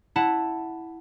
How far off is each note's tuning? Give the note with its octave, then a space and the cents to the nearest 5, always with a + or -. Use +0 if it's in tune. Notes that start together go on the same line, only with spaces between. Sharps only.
E4 +0 F#5 +0 A5 +0